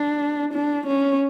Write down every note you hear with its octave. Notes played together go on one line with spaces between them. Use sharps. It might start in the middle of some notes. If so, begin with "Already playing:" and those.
Already playing: D4
D4
C#4